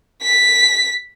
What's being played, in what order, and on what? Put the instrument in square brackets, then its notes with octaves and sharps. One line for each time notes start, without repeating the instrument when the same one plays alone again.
[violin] B6